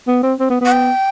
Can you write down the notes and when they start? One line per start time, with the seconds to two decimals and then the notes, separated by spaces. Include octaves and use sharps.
0.08 B3
0.23 C4
0.40 C4
0.50 B3
0.61 B3 F#5
0.72 G5